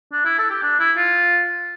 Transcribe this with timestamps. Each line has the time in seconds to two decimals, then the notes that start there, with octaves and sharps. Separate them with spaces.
0.13 D4
0.25 E4
0.38 A4
0.51 G4
0.63 D4
0.80 E4
0.97 F4